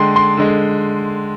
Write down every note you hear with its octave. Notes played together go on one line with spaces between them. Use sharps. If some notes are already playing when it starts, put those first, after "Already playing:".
Already playing: D3 G#3 G5 C6
C6
D3 G#3